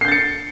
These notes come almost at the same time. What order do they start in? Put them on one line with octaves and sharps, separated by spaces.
C7 G6 A6 C#7